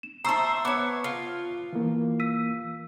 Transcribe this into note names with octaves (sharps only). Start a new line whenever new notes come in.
E7
C5 E5 A5 A#5 C#6 D#6 E6 E7
B3 C#5 D6
F4
E3 A#3
E6 B6 D#7